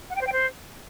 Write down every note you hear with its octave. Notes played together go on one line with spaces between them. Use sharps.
F#5
G5
C5
G5
C5